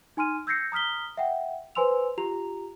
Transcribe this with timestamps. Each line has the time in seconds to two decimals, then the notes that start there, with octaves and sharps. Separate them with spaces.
0.17 D#4 G#5 C6 F6 D#7
0.47 E6 G6 G#6 A#6 C7 C#7
0.72 A#5 D#6 F6 B6 G7
1.17 E5 F#5 G5
1.75 B4 C5 G#5 C6 E6 F7
2.18 F4 G4 A#5 F7